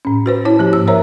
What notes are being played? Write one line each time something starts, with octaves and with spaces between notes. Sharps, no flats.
A2 C#4
F#4 B4 C5
E4 C#5 A5
F3 A#3 G4
G#2 E6
A#4 C5 C#5 E5 A#5